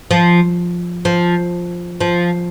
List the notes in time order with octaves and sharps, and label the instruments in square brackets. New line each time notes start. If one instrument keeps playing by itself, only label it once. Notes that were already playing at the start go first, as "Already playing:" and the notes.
[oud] F3
F3
F3